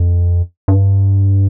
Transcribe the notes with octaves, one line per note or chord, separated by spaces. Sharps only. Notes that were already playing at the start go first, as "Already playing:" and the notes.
Already playing: F2
G2